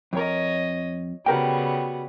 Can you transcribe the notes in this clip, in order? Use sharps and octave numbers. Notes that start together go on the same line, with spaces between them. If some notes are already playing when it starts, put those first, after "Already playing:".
F2 A#4 C#5 D#5
C#3 G3 B3 F#4 A#4 G5